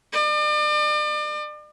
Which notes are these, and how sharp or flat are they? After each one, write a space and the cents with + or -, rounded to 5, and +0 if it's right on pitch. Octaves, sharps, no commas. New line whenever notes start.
D5 +40